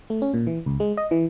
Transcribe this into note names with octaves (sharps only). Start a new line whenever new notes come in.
A3
C#4
A#2
E3
C#2
G#3
D#5
E3